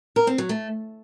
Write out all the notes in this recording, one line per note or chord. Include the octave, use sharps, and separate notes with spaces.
A#4
C4
F#3
A3